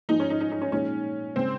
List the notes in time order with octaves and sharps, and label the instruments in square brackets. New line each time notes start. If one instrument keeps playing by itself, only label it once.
[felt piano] G#2 F3 G#3 [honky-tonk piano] D#4
[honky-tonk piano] C#4
D#4
D#4
D#4
C#4
[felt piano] A#2 F3 G#3 D#4 G#4 [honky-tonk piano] C#4
[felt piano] C#3 G#3 [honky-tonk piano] C4